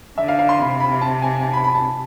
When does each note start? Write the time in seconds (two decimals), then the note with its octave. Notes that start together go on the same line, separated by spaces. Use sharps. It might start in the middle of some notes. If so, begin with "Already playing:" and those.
0.18 D3 E5
0.28 F5
0.39 F5
0.49 C6
0.60 C3 B5
0.80 B5
1.01 A5
1.22 G#5
1.43 A5
1.53 B5
1.64 B5
1.74 A5